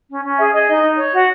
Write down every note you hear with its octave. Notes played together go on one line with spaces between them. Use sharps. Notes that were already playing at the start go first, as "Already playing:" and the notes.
C#4
C#4
G#4 E5
G#4 D#5
D#4 D#5
D#4
C#5
F#4